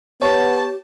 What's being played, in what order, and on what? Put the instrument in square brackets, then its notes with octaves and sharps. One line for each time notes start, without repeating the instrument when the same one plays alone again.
[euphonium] B3 [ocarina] G4 [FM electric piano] C#5 [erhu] A5